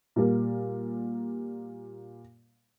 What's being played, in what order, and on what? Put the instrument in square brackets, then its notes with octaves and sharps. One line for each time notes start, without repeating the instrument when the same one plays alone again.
[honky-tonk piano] A#2 G3 A#3